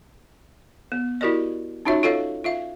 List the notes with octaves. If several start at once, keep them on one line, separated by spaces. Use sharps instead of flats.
B3
E4 F#4 G4 A#4 D5 D#5
C#4 D#4 F4 F#4 C#5 E5
F4 A4 C#5 D#5 F5
F4 E5 F5